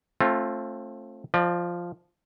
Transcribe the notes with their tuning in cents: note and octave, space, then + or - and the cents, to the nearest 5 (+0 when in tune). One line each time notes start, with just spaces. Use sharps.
A3 +0 C4 +30 F4 +0
F3 +0 D5 +40